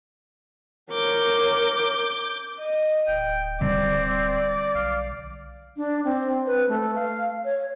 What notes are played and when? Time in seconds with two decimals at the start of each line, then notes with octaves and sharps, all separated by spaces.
0.92 A#4 C#5 D6 G6
2.60 D#5
3.08 D1 G5
3.61 D3 G3 C4 D5
4.03 D5
4.75 B1 F5
5.77 D4
6.04 C4
6.47 B4
6.69 A3
6.95 F5
7.45 C#5